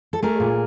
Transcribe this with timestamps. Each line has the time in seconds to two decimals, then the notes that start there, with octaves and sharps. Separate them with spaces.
0.13 A4
0.22 A3 G#4 A#4
0.40 A#2